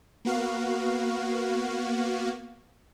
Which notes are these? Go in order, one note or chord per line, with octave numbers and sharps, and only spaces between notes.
A#3 B3 F#4 F5